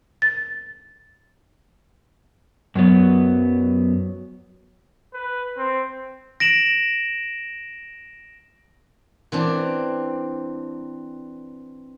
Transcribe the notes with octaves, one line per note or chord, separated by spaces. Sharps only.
A6
F#2 F#3 B3
B4
C4
A#6 D7 E7 F#7
E3 C4 D4